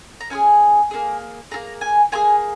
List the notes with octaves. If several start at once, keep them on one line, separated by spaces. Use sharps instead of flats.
A#5
C#4 F4 G#4 G#5
A#3 C#4 G#4
A#3 F4 G#4 A#5
G#5
A#3 F4 G#4 G#5